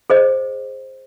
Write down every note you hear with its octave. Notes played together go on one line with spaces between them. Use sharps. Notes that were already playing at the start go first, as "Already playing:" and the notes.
G#4 C5 D#5